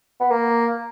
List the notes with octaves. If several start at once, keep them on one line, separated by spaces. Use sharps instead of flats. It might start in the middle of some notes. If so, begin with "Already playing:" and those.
B3
A#3